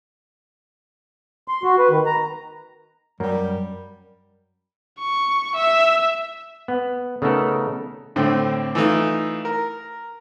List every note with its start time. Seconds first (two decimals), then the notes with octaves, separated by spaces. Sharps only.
1.48 C6
1.63 F#4
1.79 B4
1.90 D#3
2.06 A#5
3.20 F#2 G3 A#4
4.99 C#6
5.56 E5
6.68 B3
7.22 C#3 A3 B3 D#4 A4 A#4
8.16 A2 D3 A3 C4
8.75 E3 A3 D#4 F4
9.45 A#4